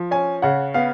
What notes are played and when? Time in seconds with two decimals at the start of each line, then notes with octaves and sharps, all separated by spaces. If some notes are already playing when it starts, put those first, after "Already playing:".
Already playing: F3
0.11 C#4 G#5
0.42 C#3 F#5
0.74 B3 F5